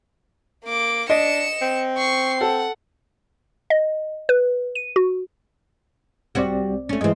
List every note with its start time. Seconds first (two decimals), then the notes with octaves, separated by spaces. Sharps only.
0.65 A#3 D6
1.10 D4 D#5 C#7 E7
1.61 C4
1.97 C#6 C7
2.41 A4 F#5
3.70 D#5
4.29 B4
4.75 D#7
4.96 F#4
6.35 C2 G3 C4 F#4 D5
6.89 A3 C#4
7.01 G2 E3 G#3 C4 D#5